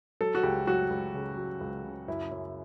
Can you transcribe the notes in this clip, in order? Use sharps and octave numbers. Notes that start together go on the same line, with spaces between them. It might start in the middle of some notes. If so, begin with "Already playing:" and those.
F#3 A4
F#4
C#2 G4
F#3 F#4
C#2
C#3
F#3
C#2
C#3
F#2 E4
F#2